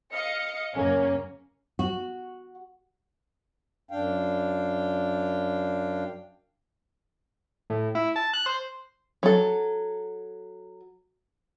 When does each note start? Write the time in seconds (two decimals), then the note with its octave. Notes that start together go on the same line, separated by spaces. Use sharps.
0.12 D#5 F5 C#7
0.75 F#2 C#3 A#3 C#4
1.79 F#4
3.91 F#2 D4 F5 G5
7.70 A2
7.95 E4
8.16 A5
8.33 F#6
8.46 C5
9.23 F#3 A4